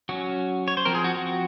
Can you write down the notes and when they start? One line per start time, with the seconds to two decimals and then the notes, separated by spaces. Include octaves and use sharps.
0.09 F#3 C#4 F#4
0.68 C#5
0.77 C5
0.85 F3 C4 A#4
0.95 G#4
1.04 F#4
1.15 F#4